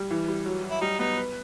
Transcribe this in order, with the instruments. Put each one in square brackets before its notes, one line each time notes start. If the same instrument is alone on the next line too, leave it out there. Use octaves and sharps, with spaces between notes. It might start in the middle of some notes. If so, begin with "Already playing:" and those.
Already playing: [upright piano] G3
E3
G3
F#3
F#3
[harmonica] E4
[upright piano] G3 [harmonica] D#4
[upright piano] B3 [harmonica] D#4
[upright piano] B4